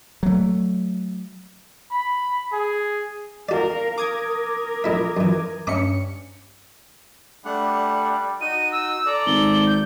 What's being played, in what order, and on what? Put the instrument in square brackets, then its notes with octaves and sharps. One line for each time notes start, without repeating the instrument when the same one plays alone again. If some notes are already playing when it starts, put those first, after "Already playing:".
[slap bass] F#3 A3
[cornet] B5
G#4
[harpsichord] F#4 D5 [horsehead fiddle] A#4 F5
[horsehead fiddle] A#4 [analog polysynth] D6 D#6 G#6
[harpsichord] A#1 E4 E5
F#2 E3
[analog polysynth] G2 C#4 C#7 [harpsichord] E5 A#5 D6
[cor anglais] G3 [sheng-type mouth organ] A3 D4 F#5
[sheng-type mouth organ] D#4 F#4 D#5 [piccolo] D#7
[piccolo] E6
[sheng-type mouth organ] A4 A#5 [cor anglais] D5
[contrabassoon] G#1 [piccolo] G7
[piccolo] G6